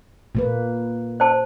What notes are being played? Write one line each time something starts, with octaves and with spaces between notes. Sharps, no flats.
A#2 A#3 B4
C5 A5